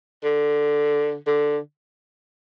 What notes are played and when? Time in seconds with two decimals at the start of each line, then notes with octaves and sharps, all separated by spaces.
0.24 D3
1.27 D3